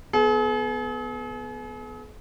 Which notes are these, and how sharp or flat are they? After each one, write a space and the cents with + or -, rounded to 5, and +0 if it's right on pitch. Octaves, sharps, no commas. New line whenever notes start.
B3 +0 G#4 +45